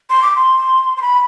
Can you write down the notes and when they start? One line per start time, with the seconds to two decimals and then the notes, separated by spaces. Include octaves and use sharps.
0.10 C6
0.23 D6
0.36 C6
0.97 C6
1.02 B5